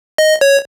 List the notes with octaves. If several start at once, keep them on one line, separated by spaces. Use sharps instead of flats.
D#5
C#5